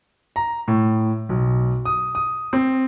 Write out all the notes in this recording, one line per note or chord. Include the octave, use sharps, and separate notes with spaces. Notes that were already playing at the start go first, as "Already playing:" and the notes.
A#5
A2
B1
D#6
D#6
C4